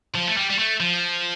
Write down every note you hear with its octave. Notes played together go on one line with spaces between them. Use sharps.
F3
A3
G3
G3
A3
F3